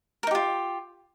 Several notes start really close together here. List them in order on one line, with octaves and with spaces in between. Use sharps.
A#4 D#4 G4 F4